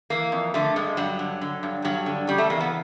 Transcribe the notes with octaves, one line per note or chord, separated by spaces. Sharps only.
E3 A#3
F2
D3 A3
G2 G#3
G2 F#3
D3
D3
G2
G2 F#3
D3
C#3 G3
A3
E2 A#3
B3